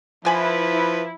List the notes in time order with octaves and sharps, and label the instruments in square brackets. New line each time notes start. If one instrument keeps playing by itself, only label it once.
[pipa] D3 G#5 B5 [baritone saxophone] F3 [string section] E4 [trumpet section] B4